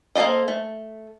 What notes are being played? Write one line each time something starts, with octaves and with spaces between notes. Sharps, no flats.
A#3 A4 C5 D5 D#5
A3